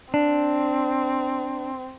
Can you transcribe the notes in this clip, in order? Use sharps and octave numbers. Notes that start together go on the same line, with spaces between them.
C4 D4